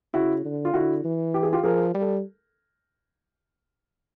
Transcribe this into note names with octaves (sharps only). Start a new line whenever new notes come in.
C#3 E4 F#4
D3
F4
D3 E4 F#4
E3
G4
G#4
F4 G4
F3 G#4 A#4
G3
A4